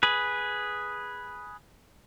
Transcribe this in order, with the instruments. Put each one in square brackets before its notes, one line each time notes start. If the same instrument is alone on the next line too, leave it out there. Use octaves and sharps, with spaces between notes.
[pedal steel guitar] G#4 B4